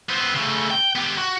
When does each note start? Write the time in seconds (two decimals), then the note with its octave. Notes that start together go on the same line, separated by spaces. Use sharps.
0.09 B3 C4
0.34 C#3 A3
0.70 G5
0.96 B3 G4
1.18 F#4